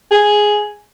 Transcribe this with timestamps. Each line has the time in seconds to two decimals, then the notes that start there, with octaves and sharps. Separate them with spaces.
0.11 G#4